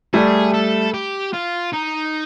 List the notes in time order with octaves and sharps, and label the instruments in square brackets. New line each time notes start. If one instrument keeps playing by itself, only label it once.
[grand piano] G3 A3 [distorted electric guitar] G#4
[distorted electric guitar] A4
G4
F4
D#4